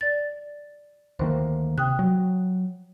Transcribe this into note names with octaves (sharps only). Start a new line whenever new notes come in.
D5 A6
D2 D#3 A#3 C5
C3 G5 D#6 F#6
F#3